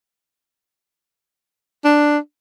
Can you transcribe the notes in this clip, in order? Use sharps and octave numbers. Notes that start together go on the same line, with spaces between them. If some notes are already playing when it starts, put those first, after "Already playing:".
D4